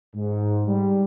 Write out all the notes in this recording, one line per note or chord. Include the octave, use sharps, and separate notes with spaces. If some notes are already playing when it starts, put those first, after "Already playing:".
G#2
G3